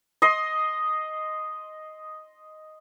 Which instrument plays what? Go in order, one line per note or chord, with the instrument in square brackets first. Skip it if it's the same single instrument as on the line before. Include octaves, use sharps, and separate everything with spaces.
[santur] D#5 C6